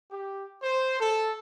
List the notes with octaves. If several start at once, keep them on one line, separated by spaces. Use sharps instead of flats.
G4
C5
A4